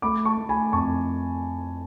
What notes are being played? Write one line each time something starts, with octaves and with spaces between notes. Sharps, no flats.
A3 B5 D6
A5 C#6
A3
G#5 B5
F2 A5 C#6